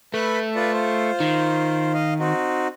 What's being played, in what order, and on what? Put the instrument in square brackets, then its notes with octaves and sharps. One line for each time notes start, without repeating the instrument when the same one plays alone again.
[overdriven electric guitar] A3 [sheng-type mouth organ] B4 B5
[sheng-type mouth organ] F4 B4 D5
F4 C5
[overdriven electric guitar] D#3
[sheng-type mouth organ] D#5 F5
C4 D#4 F#4